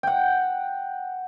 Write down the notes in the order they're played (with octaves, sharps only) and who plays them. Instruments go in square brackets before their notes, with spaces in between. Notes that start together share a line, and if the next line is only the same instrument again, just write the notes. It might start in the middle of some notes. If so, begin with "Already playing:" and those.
[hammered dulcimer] F#5 G5